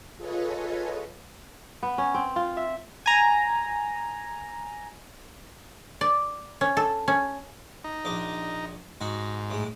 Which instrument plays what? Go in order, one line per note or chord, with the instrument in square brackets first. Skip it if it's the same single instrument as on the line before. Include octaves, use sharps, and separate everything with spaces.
[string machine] F4 G#4 A4 B4 C#5 D#5
[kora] B3
C#4
C4
F4
E5
[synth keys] G#5 A#5
[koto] D5
C#4
A4
C#4
[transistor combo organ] D#4
[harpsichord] A#1 D4 D#5
[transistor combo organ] G#2 [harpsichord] D#4 F#4
[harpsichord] A2 G#3